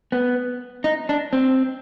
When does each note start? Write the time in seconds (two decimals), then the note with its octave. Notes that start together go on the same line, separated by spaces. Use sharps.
0.12 B3
0.84 D#4
1.09 D4
1.33 C4